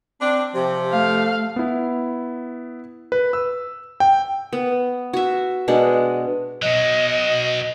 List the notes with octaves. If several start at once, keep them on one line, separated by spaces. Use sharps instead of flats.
C4 D4
C3 F3 G4
A3 F5
B3 E4
B4
E6
G5
B3
F#4 E5
B2 G#3 D4 F#5
B2 F#3 D#5